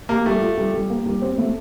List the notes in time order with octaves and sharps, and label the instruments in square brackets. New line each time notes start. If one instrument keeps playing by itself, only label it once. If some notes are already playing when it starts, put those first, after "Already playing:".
[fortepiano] A#3 [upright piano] G4
[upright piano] G3 [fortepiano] A3
[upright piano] F4
G3
G3
A#3
G3
C4
A3